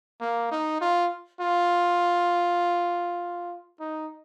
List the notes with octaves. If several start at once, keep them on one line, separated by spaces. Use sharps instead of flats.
A#3
D#4
F4
F4
D#4